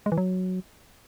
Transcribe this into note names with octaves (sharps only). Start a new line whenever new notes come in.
G#3
E3
F#3